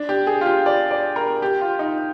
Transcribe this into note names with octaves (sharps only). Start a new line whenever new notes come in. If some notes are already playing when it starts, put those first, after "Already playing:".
Already playing: D4
G4
G#4
F4
G4
D5
D5
A#4
G4
F4
D#4